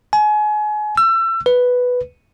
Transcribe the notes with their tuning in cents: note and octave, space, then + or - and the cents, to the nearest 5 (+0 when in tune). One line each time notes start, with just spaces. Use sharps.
G#5 +30
E6 +30
B4 +0